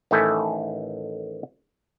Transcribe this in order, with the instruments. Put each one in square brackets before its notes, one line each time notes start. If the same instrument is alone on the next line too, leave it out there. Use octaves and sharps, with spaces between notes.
[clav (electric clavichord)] A1 D#3 A3 E4 A4 G#5